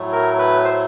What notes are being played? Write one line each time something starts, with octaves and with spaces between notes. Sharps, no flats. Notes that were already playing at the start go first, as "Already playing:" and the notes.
Already playing: A2 F#3 A3
A#4
B4
C5